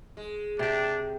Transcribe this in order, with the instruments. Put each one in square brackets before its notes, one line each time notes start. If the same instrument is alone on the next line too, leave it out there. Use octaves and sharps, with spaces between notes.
[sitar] G#3
[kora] C3 G4 [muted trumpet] D4